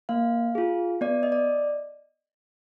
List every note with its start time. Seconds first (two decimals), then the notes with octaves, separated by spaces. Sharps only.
0.09 A#3 F5
0.55 F4 G#4
1.01 B3 D5
1.23 D#5
1.32 D5